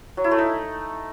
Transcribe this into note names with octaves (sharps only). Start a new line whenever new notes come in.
F#3
E4
A3
D#4